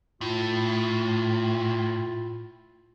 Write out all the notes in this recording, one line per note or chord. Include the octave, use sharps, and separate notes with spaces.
A2 E4 F4